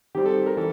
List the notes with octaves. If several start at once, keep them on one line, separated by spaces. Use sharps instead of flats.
D#3 G3 C4 G4
A4
A4
A#4
E3 G3 A4